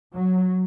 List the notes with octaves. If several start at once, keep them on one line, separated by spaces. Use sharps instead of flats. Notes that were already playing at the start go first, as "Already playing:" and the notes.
F#3